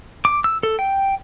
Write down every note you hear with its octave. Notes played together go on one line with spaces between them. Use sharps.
D6
E6
A4
G5